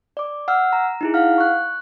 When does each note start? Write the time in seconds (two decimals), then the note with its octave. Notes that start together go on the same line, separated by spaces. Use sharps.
0.17 D5 D6
0.48 F#5 E6 F6
0.73 A#5
1.01 D#4 E4 G#4
1.14 F5 F#5 F6
1.38 C#6 F#6